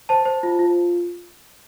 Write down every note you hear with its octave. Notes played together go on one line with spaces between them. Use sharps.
C5 A5
C5
F4
F4